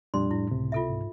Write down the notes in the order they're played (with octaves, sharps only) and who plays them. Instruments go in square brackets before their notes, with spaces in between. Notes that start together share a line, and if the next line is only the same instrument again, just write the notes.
[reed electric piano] F2 G3 D4 [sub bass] A#2 [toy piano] C6
[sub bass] A2 [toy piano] E4
[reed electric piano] C#2 C3
[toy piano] F4 A4 E5
[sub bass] G#2